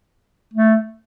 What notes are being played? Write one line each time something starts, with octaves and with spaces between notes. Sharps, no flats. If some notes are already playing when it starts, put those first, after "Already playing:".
A3